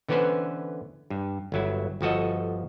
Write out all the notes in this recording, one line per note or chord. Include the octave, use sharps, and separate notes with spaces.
D3 E3 B3 C#4 B4 C5
G2
G1 F#3 E4
G1 F3 F#4 A4 D#5